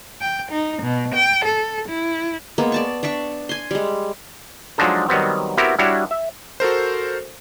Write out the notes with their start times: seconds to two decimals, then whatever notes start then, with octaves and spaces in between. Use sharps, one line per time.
0.20 G5
0.51 D#4
0.82 B2
1.14 G5
1.44 A4
1.88 E4
2.58 G#3 A#3 B3
2.72 D5 A5 C#6
3.03 D4 D5 E5 C#6
3.49 G#5 C6
3.71 G3 G#3
4.78 F3 F#3 G#3 D4 D#4 A4
5.09 D#3 F#3 G3 B3 C4
5.57 B3 C4 E4 F#4 G4 A#4
5.79 G3 D4 E4 F#4 C#5
6.11 E5
6.60 F#4 A4 A#4 C5